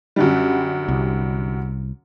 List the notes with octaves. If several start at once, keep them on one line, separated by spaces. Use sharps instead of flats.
F#2 D3 G3
C2